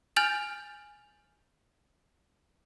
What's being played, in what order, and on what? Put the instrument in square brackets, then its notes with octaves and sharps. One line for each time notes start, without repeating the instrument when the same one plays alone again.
[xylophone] G#5 F6 G6 A6 F7 F#7